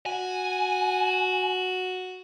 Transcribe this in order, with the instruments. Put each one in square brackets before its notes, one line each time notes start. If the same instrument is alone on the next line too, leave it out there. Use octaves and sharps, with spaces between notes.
[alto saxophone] F#4 [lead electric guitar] G#5